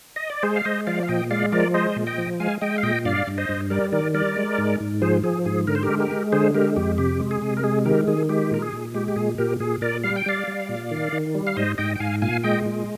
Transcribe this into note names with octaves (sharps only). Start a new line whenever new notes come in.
D#5
D5
G#3 G#4 C5
F5
G#3 C5 D#5
F3 D5 F5
F5
A#2 D#5 G5
G#3 D5 F5
F3 A#4 D5
G#3 C5 D#5
A#2
D#5 G5
F3
G#3 F5 G#5
G#3 D#5 G5
F5
A#2 D#5 G5
G2 D5 F5
G2
C5 D#5
G2
G3 A#4 D5
D#3 A#4 D5
G3 A#4 D5
G#3
G#2
G#2
F3 G#4 C5
F3 G#4
G#2 G#4
D3 A#4
C5
G4 A#4
G#3
G4 A#4
G#3
D3 G#4 C5
G#3 G4 A#4
F2 G4
C3 G4
G#3
G#4
C3
A#4
G#3 G#4
D#3 G4 A#4
D#3 G#4
G#3 G4
A#2 A#4
G#4
A#2
G#3 G4
G4
A#2 G#4
A#2 G4 A#4
A#2 G#4
A#2 A#4 D5
G3 F5
G5
G3 D5 F5
G3
A#2
D#3
D#3
G3
F5
G#2 C5 D#5
G#2 D#5 G5
G5
G#2 F5 G#5
A#2 F5 G#5
G#3 D#5 G5
A#2